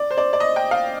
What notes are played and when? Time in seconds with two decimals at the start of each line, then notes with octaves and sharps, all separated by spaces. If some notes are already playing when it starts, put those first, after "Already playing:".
Already playing: D5
0.11 C5
0.17 D5
0.33 D5
0.40 D#5
0.56 G5
0.71 F5